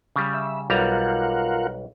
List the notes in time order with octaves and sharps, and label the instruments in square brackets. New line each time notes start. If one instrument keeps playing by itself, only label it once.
[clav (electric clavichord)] C#3 G3
[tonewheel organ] E5
[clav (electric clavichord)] B1 G3 A#5 [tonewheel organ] F4 A#4 F#5